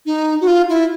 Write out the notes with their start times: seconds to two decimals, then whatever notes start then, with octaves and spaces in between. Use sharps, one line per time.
0.06 D#4
0.41 F#4
0.47 F4
0.69 E4